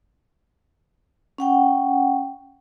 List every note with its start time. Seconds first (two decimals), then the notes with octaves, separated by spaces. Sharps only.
1.38 C#4 F#5 G5